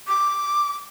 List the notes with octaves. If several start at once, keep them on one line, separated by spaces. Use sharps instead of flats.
D6